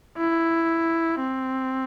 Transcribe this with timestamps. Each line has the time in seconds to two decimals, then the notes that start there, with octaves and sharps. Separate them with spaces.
0.18 E4
1.19 C4